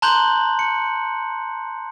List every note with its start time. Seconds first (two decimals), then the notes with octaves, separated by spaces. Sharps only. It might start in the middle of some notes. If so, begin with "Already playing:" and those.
0.02 A5 A#5 C6 F#6 G6 F#7
0.59 C#7